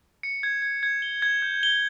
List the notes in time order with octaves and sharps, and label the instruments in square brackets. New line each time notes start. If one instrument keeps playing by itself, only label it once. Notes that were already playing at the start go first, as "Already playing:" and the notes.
[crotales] C#7
G#6
G#6
G#6
G7
G#6
G6
G7